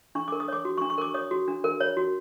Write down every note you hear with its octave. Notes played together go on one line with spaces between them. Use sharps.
D4 C#6
A#4 D6
D#6
C#5 D6
F#4
C#6
D4
C#6
A#4 D6
C#5 D#6
F#4
D4
A#4
C#5
F#4